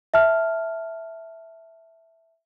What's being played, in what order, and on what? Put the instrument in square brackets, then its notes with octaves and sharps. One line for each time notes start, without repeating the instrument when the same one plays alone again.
[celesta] E5 A5 F6